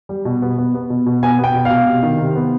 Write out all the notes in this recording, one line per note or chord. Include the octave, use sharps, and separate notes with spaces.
G3
B2
B3
B3
B3
B2
B2
B3 G#5
B3
G5
B2
F5
B2
C3
D#3
C3
B3